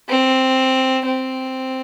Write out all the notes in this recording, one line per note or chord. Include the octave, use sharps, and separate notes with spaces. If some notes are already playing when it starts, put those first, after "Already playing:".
C4
C4